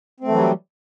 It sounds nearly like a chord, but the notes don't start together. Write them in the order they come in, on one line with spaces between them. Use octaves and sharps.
C4 A3 E3 F#3 G3